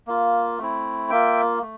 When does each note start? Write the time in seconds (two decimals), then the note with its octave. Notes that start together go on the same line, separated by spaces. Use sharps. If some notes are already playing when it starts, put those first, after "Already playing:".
0.07 A#3 F4
0.59 A3 C4 E4
1.10 A#3 F4 E5 G5
1.62 A3